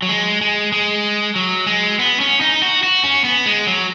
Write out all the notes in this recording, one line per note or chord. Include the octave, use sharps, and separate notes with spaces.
F#3
G#3
G#3
G#3
F#3
G#3
B3
C#4
D#4
F#4
F#4
C#4
B3
G#3
F#3